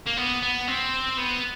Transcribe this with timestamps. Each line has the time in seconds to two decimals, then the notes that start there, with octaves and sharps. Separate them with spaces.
0.07 A#3
0.18 B3
0.43 B3
0.68 C4
1.17 B3